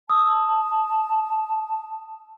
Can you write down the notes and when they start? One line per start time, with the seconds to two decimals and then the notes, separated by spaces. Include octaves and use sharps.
0.10 A5 D#6 E6